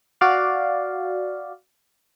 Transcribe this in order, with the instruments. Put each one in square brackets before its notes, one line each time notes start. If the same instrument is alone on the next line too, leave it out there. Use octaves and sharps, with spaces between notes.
[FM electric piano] F#4 D5 F5